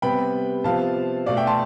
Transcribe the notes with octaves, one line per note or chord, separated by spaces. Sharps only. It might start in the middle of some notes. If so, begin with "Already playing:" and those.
C3 G3 B3 G5 B5
C3 F3 B3 F5 A5
B2 A3 D5 F5
E5 G5
A5 C6